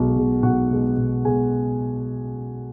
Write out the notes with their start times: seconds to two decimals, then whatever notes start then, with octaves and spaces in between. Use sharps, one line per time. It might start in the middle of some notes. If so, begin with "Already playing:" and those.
Already playing: B1 B2 G#3 F#4
0.16 B2 G#3
0.43 B1 F#4 F#5
0.71 B2 G#3
0.97 B1
1.25 B2 G#3 G#4 G#5